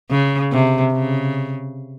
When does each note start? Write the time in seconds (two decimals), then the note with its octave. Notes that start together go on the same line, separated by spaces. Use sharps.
0.11 C#3
0.52 C3
0.93 C#3